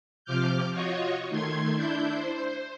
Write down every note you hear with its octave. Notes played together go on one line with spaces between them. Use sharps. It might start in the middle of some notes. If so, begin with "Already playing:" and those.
C3 F3 D6 F6 G6
F4 F#4 C#5 D#5 C#6
D#3 A3 C6 G#6
D4 E4 G6
C5